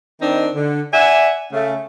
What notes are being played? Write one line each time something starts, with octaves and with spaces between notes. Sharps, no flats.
D#3 C4 D4 D#4
D3
D5 E5 F#5 G#5
C#3 A3